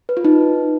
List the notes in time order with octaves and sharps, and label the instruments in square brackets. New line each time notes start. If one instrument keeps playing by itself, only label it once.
[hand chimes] B4
F4
D#4